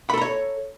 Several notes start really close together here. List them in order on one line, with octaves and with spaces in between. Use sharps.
B5 A4 A#5 C#5